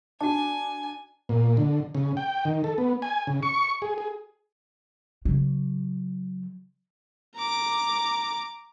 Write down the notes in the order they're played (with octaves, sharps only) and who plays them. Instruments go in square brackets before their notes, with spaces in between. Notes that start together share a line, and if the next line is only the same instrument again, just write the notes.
[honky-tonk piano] D4 [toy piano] F#4 A5 [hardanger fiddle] G#5
[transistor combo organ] A#2
D3
C#3
G5
D#3
A4
B3
G#5
C#3
C#6
G#4
G#4
[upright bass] C#3 F#3
[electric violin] A#5 D6